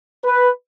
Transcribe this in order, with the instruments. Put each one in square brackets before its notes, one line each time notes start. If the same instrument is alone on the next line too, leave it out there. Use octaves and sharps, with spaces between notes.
[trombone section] B4